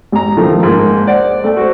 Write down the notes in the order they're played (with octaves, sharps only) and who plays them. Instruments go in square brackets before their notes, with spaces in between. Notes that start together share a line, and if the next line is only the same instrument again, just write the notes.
[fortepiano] A1 A#5
D#3 F3 A3
G#2 A#3
C5 D5 F#5
A3 A4
F#4 C5